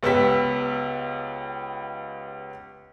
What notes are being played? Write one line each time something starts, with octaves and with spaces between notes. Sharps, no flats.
C#2 B3 G4 E6 B6